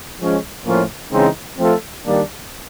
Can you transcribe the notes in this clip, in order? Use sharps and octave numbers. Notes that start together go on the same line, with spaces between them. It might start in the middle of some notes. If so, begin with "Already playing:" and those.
F3 G#3 C#4
A2 F3 A#3 C#4 F4
C#3 E3 G#3 C4 D#4
F3 A3 C4 F4 A4
D#3 G3 A#3 D4